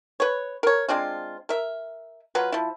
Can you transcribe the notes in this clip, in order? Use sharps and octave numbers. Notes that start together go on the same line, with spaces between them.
B4 C#5
A#4 C#5
G#3 C4 D4 F4
A#4 E5
F#3 F4 B4
F3 E4